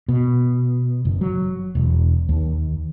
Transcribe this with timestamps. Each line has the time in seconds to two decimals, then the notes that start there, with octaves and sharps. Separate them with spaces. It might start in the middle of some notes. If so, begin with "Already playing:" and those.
0.08 B2
1.05 F#1
1.21 F#3
1.75 E1
2.29 D#2